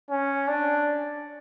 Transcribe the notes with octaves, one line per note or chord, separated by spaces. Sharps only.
C#4
D4